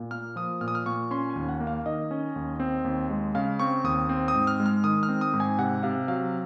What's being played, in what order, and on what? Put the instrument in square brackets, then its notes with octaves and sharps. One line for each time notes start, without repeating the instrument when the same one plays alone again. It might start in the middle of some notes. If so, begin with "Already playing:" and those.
Already playing: [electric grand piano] A#2
A#3 F6
F3 D#6
A#2 F6
D#6
F6
A#2 C#6
C#4 C6
G#5
D#2
F#5
A#3
F5
D#3 D#5
C#4
D#2
C4
D#2
G#3
C#3 F5
C4 C#6
D#2 D#6
C4 D#6
D#6
G#2
F6
G#3
F6
D#3 D#6
F6
C4
D#6
G#2
G#5
C3 F#5
C3 F5
F#3 F5